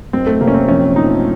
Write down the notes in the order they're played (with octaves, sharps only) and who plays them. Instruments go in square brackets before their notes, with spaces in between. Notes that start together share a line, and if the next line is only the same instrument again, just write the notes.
[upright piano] F#1 [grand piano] C4
[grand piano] A3
[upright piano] C3 [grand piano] A#3
[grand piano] C#4
C4
[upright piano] A#1 [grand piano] C#4
[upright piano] F3 [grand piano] D#4